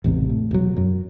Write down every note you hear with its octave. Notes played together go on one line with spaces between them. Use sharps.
A1 E2 G#2 C3
A2
E1 F#3
F#2 F#3